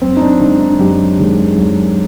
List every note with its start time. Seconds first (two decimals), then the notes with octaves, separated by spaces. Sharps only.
0.02 F#2 C4
0.17 D#4
0.22 D4
0.40 D#3 G#3 D#4
0.60 D#4
0.79 F#2 G4
1.19 D#3 G#3
1.58 F#2